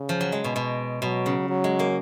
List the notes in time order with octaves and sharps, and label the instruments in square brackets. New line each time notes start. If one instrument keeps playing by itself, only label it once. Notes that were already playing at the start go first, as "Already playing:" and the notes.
Already playing: [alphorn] C#3
[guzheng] F3
F#3
G#3
B2
B2
[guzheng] B2 [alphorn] F#3
[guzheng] C#3
[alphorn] F#3
[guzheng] G#3
A#3